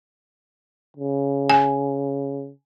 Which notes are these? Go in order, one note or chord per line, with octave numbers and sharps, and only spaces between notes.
C#3
G#5